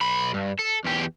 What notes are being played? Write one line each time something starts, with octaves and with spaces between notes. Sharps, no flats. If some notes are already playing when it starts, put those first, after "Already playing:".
B1 B5
G2
A4
E2 G4